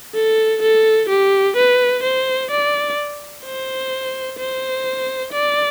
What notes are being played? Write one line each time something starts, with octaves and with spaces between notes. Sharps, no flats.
A4
A4
G4
B4
C5
D5
C5
C5
D5